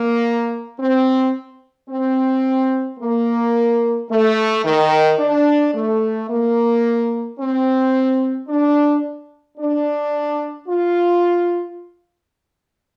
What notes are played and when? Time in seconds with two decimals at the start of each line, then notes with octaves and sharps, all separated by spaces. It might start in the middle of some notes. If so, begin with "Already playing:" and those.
Already playing: A#3
0.79 C4
1.89 C4
2.99 A#3
4.09 A3
4.64 D#3
5.19 D4
5.74 A3
6.29 A#3
7.38 C4
8.48 D4
9.58 D4
10.68 F4